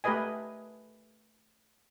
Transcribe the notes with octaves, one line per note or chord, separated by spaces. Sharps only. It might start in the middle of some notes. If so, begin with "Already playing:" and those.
A3 G4 A#4 B4 D#5 G#5